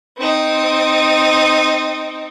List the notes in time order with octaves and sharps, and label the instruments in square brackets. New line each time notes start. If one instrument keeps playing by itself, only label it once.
[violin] C4 D#4